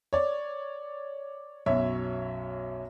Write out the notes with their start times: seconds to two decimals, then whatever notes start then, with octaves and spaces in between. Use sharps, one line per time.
0.13 C#5 D5
1.66 B1 F#2 C#5 E5